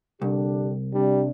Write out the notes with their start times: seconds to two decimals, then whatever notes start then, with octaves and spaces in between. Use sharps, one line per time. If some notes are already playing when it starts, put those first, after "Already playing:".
0.22 C2 D3 D4 G4
0.94 C3 G3 D4